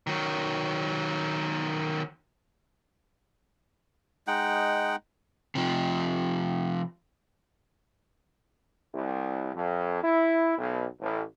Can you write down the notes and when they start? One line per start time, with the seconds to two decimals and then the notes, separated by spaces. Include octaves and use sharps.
0.07 D#3 F#3
4.27 G#3 D#4 F#5 G5
5.55 C3 F3
8.94 C2
9.54 F2
10.03 E4
10.58 B1
11.00 A1